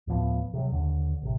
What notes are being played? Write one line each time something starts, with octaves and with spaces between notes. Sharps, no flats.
D2 A2 F3 B3
C3 F#3
D#2 D3
A1 C3